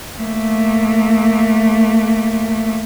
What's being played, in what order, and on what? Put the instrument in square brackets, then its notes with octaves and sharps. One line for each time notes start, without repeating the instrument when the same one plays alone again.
[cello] A3 A#3